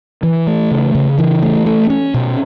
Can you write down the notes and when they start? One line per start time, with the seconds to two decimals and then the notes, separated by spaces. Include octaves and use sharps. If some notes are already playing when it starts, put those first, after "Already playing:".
0.23 E3
0.47 A3
0.71 C#3
0.95 C#3
1.18 E3
1.42 A3
1.66 A3
1.90 C#4
2.14 B2